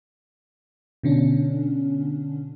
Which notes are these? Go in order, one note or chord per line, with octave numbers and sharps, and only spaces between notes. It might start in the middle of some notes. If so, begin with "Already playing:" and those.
B2 D3 C#4 D4